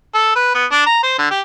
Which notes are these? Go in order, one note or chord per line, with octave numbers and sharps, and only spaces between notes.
A4
B4
B3
D4
A#5
C5
D3
G4